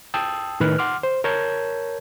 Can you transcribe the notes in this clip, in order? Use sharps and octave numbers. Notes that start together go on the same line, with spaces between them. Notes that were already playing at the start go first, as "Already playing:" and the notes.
G5 A5 D#6 E6
A2 D#3 B4 F6 F#6
F#5 C6 D6 F6
C5
A#4 C#5 A5 G6 G#6